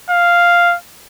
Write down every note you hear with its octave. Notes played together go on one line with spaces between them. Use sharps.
F5